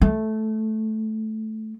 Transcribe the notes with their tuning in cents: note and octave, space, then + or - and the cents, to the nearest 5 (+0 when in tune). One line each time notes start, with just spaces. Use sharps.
A3 -10